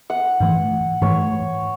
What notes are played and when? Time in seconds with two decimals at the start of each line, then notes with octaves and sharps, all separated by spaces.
0.10 F#5
0.40 G#2 E3 A3
1.02 G#2 E3 A3 C#5